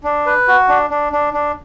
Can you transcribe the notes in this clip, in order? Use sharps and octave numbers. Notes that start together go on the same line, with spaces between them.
D4
B4
F#4
D4
D4
D4
D4